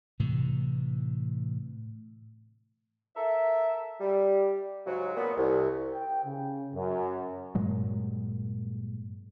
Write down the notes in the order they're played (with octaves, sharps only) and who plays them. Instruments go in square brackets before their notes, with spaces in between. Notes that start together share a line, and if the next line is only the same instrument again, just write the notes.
[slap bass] A2 C3 E3
[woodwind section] A4 A#4 E5
G3
G#2 C#3 F#3
A#2 B3
C2
[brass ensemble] G5
C#3
F#2
[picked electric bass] G2 A#2 F#3 G#3